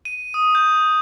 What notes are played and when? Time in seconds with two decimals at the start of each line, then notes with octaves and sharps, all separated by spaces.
0.05 D#7
0.34 D#6
0.55 G6